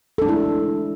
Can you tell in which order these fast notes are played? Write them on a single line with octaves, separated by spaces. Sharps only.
A4 D4 G#3 E4